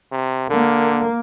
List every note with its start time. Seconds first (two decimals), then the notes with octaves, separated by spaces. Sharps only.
0.12 C3
0.50 D3 A#3